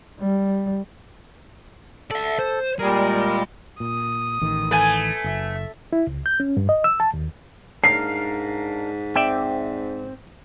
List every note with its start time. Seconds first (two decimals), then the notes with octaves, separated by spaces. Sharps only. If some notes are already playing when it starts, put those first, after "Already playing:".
0.20 G3
2.11 A4 D5 E5
2.39 C5
2.79 A#2 G3 G#3 A#4
3.80 A#2 D#6
4.41 A1 D#3
4.71 A3 B4 G#5
5.24 F#1 E5
5.93 E4
6.07 C#2
6.26 G6
6.40 C#4
6.57 G2
6.69 D#5
6.84 E6
7.00 A5
7.13 D#2
7.84 G#2 D4 A#4 F5 C7
9.16 C4 D5 E5 G5